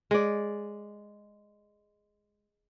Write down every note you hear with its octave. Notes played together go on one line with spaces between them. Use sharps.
G#3 D5